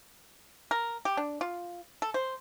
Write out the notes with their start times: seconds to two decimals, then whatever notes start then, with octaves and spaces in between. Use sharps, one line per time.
0.71 A#4
1.05 G4
1.17 D4
1.41 F4
2.02 A4
2.14 C5